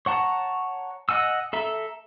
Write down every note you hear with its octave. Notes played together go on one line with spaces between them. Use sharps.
C#5 F#5 A5 A#5
D#5 F#5 G#5 E6
A4 E5 A#5